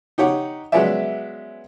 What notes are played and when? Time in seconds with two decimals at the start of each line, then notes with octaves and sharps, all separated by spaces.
0.18 D#4 G4 C#5 F#5
0.72 F#3 G#3 B3 C#4 D5 E5